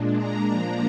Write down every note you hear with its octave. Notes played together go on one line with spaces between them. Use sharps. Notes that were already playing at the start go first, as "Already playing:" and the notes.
Already playing: A#2 G#3 D4
A#5
F3 A#3 D4